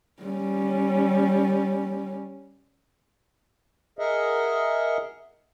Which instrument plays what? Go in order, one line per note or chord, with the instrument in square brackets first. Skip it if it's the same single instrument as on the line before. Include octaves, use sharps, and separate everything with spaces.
[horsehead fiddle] G3 C#4
[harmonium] G#4 A#4 D#5 E5 F#5